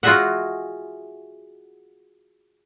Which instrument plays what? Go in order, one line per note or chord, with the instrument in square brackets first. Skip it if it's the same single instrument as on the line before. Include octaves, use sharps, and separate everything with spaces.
[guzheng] F4 F#4 G#4 D#5 E5 F#5